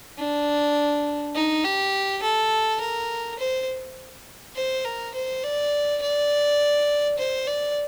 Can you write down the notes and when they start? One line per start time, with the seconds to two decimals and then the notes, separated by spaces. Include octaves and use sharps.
0.18 D4
1.35 D#4
1.64 G4
2.22 A4
2.81 A#4
3.39 C5
4.56 C5
4.85 A#4
5.14 C5
5.43 D5
6.02 D5
7.18 C5
7.47 D5